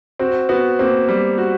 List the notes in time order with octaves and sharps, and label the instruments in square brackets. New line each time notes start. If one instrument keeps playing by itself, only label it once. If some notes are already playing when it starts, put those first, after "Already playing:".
[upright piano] C4 [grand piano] F#4
[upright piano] B3 [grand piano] F#4
[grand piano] A#3 [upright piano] C4
[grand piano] G3
F#4